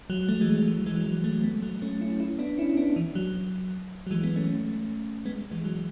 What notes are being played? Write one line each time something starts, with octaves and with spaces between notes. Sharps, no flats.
F#3
F#3 A3
E3 G#3
F#3
E3
F#3
E3 G#3
F#3
F#3
G#3
F#3 A3
G#3 B3
F#3 A3
A3 C#4
C#4 E4
C#4 E4
B3 D4
C#4 E4
B3 D4
E3
F#3
F#3
E3 G#3
G#3 B3
A3 C#4
G#3 B3
E3 G#3
F#3